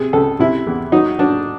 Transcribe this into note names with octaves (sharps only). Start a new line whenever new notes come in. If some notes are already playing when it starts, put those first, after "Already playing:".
Already playing: C3 G#4
C#2 A4
C3 E4
E2
F#3 D#4
F#3 D4